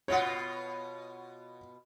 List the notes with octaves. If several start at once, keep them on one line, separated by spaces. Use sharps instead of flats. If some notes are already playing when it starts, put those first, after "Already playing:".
B2 B3 F4 C#5 F#5